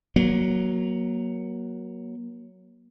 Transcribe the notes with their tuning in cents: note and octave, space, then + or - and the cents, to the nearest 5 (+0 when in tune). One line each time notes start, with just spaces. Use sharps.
F#3 +0 A#3 +25